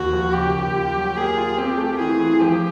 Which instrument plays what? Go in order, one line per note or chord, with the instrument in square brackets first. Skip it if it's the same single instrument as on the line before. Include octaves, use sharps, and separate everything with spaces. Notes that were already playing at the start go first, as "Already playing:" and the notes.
Already playing: [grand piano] D#2 [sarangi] F#4
[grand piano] F3
[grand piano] C#3 [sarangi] G4
[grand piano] D#2
F4
F#3
[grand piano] A#3 [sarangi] G#4
[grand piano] F4
[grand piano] C4 [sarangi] G4
[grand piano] A3
[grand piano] E3 [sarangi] G#4
[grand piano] E3
[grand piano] F3 [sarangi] G4